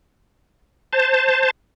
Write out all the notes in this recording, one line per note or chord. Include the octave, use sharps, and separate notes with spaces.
C5 A5